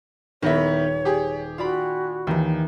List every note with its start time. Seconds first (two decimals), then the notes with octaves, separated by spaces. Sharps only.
0.42 D#1 D#3 B3 E4 C#5 A#6 B6
1.05 G4 G#4
1.58 F4 F#4 D5 B5
2.27 D#2 D#3 E3